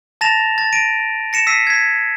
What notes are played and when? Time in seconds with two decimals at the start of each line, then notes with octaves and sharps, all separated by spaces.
0.21 A5 A6 A#6 E7 F7
0.58 A6
0.73 A#6 D7 D#7
1.33 A#6 C#7 E7
1.47 E6 B6 C7 D#7
1.67 G#6 B6